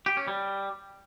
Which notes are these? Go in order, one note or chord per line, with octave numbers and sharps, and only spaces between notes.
G4
C#4
G3